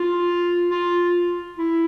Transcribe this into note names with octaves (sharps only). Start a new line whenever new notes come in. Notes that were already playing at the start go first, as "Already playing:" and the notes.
Already playing: F4
F4
E4